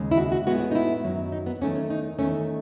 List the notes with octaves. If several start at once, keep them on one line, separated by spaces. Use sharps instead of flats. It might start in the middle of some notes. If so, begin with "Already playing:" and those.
Already playing: D#2 C#3 G#3
E4
F#4
F#4
A2 G#3 B3 F#4
F#4
D#4
E4
F#2 D#3 F#3
D#4
B3
E2 D#3 A3 C#4
C#4
D#4
E2 D#3 A3 C#4